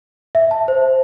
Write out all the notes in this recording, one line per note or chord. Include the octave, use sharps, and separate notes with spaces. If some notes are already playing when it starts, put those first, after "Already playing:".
E5
A5
C5